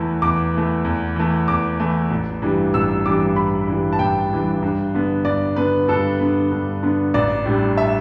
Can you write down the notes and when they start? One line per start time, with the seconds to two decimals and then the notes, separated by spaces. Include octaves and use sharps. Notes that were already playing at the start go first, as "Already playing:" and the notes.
Already playing: E2 E3 A3
0.22 E2 D6
0.54 E3 A3
0.84 E2
1.16 E3 A3
1.48 E2 D6
1.80 E3 A3
2.10 A1
2.42 G2 E3 G3
2.74 A1 E6
3.06 G2 E3 G3 D6
3.36 A1 B5
3.67 G2 E3 G3
3.93 A5
3.99 A1 G5
4.31 G2 E3 G3
4.63 G2
4.94 D3 B3
5.25 G2 D5
5.56 D3 B3 B4
5.88 G2 A4
6.19 D3 B3
6.52 G2
6.83 D3 B3
7.14 A1 D5
7.46 A2 G3 D4
7.77 E5